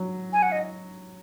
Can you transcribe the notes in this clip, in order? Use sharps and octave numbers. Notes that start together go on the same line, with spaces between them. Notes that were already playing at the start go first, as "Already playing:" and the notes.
Already playing: F#3
G#5
F#5
D#5